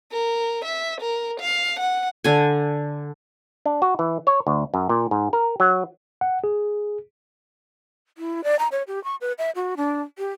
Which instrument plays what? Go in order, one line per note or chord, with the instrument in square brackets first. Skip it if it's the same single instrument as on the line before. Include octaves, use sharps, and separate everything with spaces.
[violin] A#4
E5
A#4
F5
F#5
[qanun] D3 G#5
[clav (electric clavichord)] D4
F#4
E3
C#5
D2
F#2
A#2
G#2
A#4
F#3
[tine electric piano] F#5
G#4
[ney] E4
D5
A#5
C#5
G4
C#6
B4
E5
F#4
D4
G4